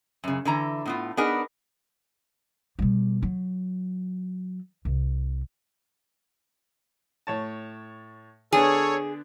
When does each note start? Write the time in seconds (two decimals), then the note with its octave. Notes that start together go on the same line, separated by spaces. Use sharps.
0.24 F#2 C#3
0.45 D3 E3 A#5
0.86 A2 B3 F4
1.17 B3 D4 D#4 G#4 A#4 B4
2.79 B2 G3
3.22 F#3
4.85 C2
7.27 A2 C#5 A5
8.52 D3 B3 D4 G#4 A4 C#5